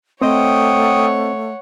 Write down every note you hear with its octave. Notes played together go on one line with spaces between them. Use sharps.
A3 C4 C5 C#5 D#5 F#5 G5 D#6